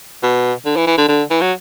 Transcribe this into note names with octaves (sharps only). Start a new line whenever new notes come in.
B2
D3
E3
E3
D3
D3
E3
F#3